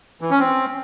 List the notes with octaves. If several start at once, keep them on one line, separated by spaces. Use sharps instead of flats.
E3
C#4
C4